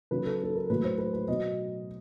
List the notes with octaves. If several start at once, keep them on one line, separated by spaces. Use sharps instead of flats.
C#3 F#3 B4
A4
A4
A#4
A2 F#3 B4
C5
B4
B4
B2 F#3 D#5